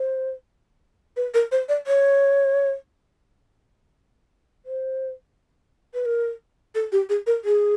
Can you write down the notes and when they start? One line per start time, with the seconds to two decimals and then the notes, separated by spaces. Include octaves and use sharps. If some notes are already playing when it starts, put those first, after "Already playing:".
Already playing: C5
1.17 B4
1.34 A#4
1.52 C5
1.69 D5
1.87 C#5
4.66 C5
5.94 B4
6.06 A#4
6.75 A4
6.92 G4
7.09 G#4
7.27 A#4
7.45 G#4